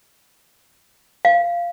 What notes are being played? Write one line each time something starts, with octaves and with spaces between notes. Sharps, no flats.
F5